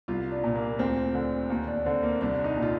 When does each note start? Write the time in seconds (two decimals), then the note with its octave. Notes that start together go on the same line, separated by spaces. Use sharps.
0.08 C2 F4
0.32 D4
0.44 A#2
0.55 A#3
0.79 D2 C4
1.14 D3
1.50 D#2
1.67 D4
1.85 D3 C4
2.03 A#3
2.21 C2 D4
2.44 D#4
2.57 A#2
2.62 F4